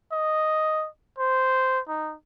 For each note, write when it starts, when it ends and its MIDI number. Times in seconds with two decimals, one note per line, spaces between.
0.12 0.87 75
1.18 1.80 72
1.88 2.14 63